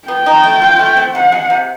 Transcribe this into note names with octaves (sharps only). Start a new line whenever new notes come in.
B3 G5
D#4
A3
F4
A3
C4
C3 F#5
G#3
C3